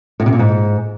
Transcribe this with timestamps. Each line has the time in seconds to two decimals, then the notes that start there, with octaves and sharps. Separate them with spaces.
0.20 A2
0.26 C3
0.33 A#2
0.39 G#2